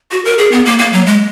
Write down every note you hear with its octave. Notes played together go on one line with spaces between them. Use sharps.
F#4
A#4
G#4
B3
A#3
A#3
F#3
G#3